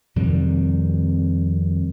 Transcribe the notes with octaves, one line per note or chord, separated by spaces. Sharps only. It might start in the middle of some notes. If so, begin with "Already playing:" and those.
F2 C3 D#3 G3